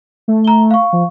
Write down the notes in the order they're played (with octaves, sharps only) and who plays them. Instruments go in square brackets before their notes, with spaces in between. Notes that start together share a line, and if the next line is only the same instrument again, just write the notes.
[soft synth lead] A3
[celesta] A#5 G7
F5 C#6
[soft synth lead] F3